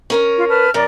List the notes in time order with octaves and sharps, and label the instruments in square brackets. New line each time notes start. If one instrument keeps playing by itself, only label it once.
[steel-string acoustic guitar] C#4 A#4 C#5
[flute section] F4
B4 A5 F6
[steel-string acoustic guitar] F#2 C#4 [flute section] A#4 D5